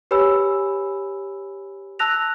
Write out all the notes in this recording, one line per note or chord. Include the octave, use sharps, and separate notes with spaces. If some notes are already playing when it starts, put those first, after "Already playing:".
G4 B4 C#5 G#5 B5 E6
A5 E6 F#6 A#6 F7